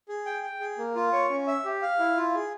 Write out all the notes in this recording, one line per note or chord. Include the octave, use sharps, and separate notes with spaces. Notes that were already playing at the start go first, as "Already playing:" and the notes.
G#4
G5
G5
G#4
A#3
F4
C#5
C#4
E5
G4
F5
E4
F4
G#4